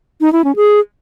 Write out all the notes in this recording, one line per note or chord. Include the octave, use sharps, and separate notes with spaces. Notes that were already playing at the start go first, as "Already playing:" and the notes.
D#4
E4
C#4
G#4